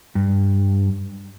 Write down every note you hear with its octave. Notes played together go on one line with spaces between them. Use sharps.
G2